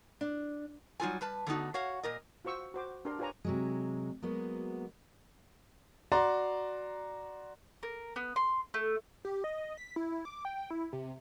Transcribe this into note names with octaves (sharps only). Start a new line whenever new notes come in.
D4
F#3 G3 D#4 F4 A4 G#5
G3 B4 A5
D3 A3 B3 D#4 F#4
F#4 C#5 F5 F#5
A#2 A#4 D#5
F4 F#4 C5 C#6 E6
F#4 C5 D6
D4 G4 A#4 C6
F4 G4 B4 C#5 G#5 A#5
C3 F#3 G#3
F#3 G#3 A#3 B3 F#4
F#4 D5 A#5 C6
A#4
B3
C6
A3
G4
D#5
B6
E4
E4
D6
G5
E4
C3